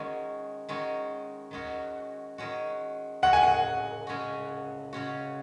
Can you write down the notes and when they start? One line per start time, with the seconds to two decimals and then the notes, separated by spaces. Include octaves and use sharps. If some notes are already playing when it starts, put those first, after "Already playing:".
Already playing: D#3 G#3 C#4 F#4
0.69 D#3 G#3 C#4 F#4
1.51 D#3 G#3 C#4 F#4
2.38 D#3 G#3 C#4 F#4
3.23 C#3 G#3 C#4 F#4 F#5
3.33 G#5
3.43 F#5
4.07 C#3 G#3 C#4 F#4
4.93 C#3 G#3 C#4 F#4